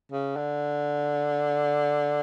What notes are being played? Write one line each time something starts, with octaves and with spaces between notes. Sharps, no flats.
C#3
D3